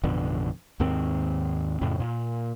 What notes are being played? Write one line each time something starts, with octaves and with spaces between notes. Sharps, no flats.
A1 F2 B2 D3
D#2 G#2 D#3 C4
F2 A2 C#3
A#2